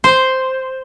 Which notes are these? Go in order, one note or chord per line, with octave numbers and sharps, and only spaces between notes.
C5